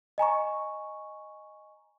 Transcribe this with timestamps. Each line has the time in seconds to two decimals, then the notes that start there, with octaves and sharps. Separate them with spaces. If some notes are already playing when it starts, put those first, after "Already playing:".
0.18 D#5 G#5 A#5 C#6